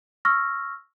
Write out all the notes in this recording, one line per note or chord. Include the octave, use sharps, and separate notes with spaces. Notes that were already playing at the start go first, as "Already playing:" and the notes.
C#6 E6 F6 A#6